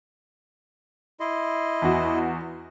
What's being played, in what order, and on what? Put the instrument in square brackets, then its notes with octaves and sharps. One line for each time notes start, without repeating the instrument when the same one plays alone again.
[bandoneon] E4 D#5 C6
[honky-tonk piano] E2 F#4